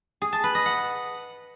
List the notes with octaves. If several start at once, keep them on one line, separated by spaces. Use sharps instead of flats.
G#4
A5
B4
D#5
F#5